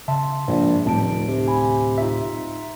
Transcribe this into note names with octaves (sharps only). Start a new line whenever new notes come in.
C#3 E5 A5 C6
A#1 G#2
F1 D2 A2 G3 C#4 A5 D7
C3
G#5 B5
D#4 F4 E5